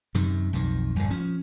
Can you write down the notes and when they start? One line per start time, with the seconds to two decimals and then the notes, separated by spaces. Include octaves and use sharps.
0.15 F#2 C3 D#3
0.53 B1 F2 D#3
0.96 A#1 G2 D3
1.10 F3 C#4